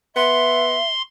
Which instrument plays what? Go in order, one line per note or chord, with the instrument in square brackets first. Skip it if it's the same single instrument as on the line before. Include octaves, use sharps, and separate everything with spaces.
[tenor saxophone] B3 [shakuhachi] E5 [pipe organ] C6